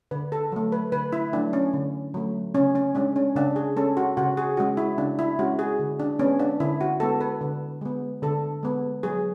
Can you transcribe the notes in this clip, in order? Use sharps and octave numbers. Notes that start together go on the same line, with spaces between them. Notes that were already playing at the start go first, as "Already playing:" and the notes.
D3 B4
A4
F#3 A3
B4
D3 B4
E4
F#3 A3 D4
C#4
D3
F#3 A3
C#3 C#4
C#4
G#3 C#4 D4
C#4
C#3 D4
G#4
G#3 C#4 A4
F#4
C#3 F#4
G#4
G#3 C#4 F#4
E4
C#3 D4
E4
G#3 C#4 F#4
G#4
D3
D4
G#3 B3 C#4
D4
D3 E4
F#4
G#3 B3 A4
B4
D3
G#3 B3
D3 A4
G#3 B3
F#3 G#4